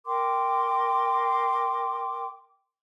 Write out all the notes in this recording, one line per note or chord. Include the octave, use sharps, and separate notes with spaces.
A#4 G5 C6 D6